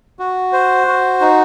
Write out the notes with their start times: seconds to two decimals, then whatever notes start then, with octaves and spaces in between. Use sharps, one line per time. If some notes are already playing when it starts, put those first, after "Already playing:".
0.19 F#4
0.52 C5
0.87 F#4
1.21 D#4